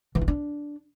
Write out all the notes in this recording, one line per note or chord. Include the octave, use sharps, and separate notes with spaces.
E3
F4
D4